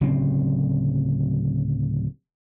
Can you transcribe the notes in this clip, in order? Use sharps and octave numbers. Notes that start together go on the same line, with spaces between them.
D1 C#3 F#3 C4